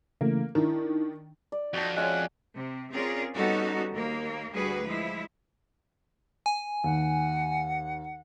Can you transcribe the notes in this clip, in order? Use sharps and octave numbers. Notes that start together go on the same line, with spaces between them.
C#3 E3 A3 A#3
D#3 D4 E4 A#4
D5
F2 D#4 F#4 A5
G#3 C#4 F4 E5 F#5 G#5
C3
C4 C#4 F4 G#4 A#4 D5
G3 B3 C#4 D#4 F#4 A4
D#2 A#3
D2 G3 F#4 G#4 B4
F3 G#3 E4
G#5
D#2 F#5